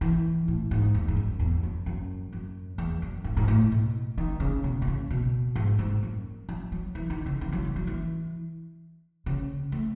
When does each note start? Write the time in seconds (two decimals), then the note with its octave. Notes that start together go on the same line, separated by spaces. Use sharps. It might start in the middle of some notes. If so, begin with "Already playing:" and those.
0.01 E3
0.48 A2
0.71 G#2
0.94 E2
1.08 G#2
1.16 F#2
1.40 E2
1.63 F#2
1.86 F#2
2.33 F#2
2.78 E2
3.02 F#2
3.24 G#2
3.37 G#2
3.48 A2
3.72 B2
4.18 D#3
4.40 C#3
4.64 B2
4.82 B2
4.87 C#3
5.10 B2
5.56 G#2
5.79 G#2
6.03 F#2
6.49 F#3
6.72 F#3
6.95 E3
7.10 D#3
7.26 C#3
7.41 E3
7.52 F#3
7.65 G#3
7.76 F#3
7.87 E3
9.26 C#3
9.72 A3